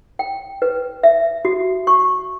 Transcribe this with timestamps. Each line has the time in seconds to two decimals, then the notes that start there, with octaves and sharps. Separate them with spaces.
0.19 G5
0.62 B4
1.03 E5
1.45 F#4
1.87 C#6